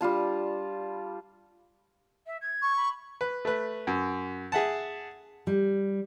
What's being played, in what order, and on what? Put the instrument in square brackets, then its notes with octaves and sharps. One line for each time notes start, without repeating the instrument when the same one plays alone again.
[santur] G3 D4 F4 A5
[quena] E5
G#6
[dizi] C#6
[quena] B5
[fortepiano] B4
A3 B4
F#2
G#4 E5 F#5 A5
[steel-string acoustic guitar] G3